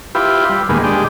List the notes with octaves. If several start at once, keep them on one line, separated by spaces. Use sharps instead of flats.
E4 F4 G4 B4
G3
D#2 A#2 G#3 B3
G#3 D4 G4